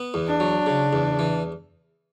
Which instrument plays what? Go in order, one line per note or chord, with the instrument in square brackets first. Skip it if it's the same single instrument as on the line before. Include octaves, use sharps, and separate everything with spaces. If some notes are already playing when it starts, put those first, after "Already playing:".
Already playing: [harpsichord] B3
E2
[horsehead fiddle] D4
[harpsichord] F#3
C#3
E2
E3